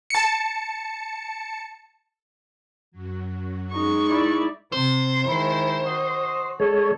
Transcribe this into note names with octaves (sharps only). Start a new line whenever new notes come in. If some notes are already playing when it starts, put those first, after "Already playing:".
A5 C#7
F#2 F#3
G#3 D#4 C#6
E4 D5
C3 C5
D#3 G#3 E4
F#4 D#5
G#3 A4 C#5